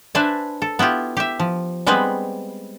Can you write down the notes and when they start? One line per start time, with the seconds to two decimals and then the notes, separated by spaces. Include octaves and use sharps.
0.15 D4 B4 C5 E5 G#5 A5
0.62 A4
0.79 B3 E4 F4 G4
1.17 G4 E5
1.39 F3
1.87 G3 G#3 B3 C4 B4